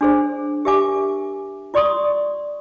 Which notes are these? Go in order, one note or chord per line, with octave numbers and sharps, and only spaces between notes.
D4 G#4 C5
G4 A#4 E5 G#5 D6
F4 D5 C6 C#6 D#6